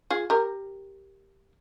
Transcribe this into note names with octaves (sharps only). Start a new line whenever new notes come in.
F4 G#4
G4 A#4